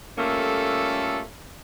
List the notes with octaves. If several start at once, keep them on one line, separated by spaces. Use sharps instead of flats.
A#2 G3 A3 A#3 C#4 A4